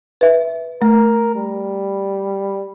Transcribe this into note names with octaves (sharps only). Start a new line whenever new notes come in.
B4 E5
A3 A#4
G3